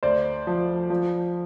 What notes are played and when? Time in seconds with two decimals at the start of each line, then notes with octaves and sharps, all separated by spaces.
0.03 D2 C5 D5
0.47 F3
0.90 F3